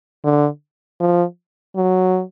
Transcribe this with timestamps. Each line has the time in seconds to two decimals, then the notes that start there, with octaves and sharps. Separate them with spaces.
0.24 D3
1.00 F3
1.76 F#3